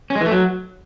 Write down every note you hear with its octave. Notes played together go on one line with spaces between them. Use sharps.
C#4
G#3
E3
A3
F#3